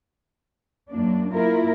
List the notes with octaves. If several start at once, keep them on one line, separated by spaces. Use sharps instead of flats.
F#2 A#3 D4
A#3 E4 F4 A#4